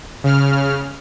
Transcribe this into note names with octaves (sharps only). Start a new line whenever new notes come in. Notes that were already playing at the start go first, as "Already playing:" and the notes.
C#3 F6